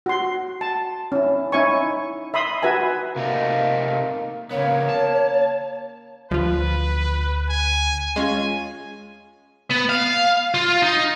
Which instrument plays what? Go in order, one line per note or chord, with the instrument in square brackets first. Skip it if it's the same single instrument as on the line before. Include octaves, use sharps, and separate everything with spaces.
[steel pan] F#4 C6
A5
C#4 E4
C#4 D#4 E4 C#5 G#5 C#6
E5 B5 C6 D#6
F#4 B4 E5 G#5 A#5
[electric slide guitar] C3 A3 D#4 [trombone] A#3
[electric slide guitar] C#3 B3 [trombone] A#3 [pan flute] C#5
[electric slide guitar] A5
[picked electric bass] D2 [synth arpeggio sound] F3 F4 [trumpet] B4
[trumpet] G#5
[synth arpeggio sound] G#3 C#4 F4 [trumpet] G#5
[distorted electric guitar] B3
F5
F4
D#4